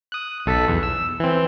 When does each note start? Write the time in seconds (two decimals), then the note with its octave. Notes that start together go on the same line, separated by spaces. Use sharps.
0.12 D#6 F#6
0.46 B1 A4 B6
0.68 E2
0.83 E6
1.20 E3 C4